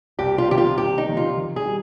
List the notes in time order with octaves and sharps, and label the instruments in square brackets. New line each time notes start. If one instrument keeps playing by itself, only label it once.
[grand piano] C2 [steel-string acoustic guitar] G4
[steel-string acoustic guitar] F4
[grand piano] C3 D#3 A#3 [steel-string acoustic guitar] G4
[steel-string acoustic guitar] F4
[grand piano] C2 [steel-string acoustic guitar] G4
[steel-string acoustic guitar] D#4
[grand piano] C3 D#3 A#3
[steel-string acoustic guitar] F4
[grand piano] D#3
[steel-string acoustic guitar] G#4
[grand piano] G3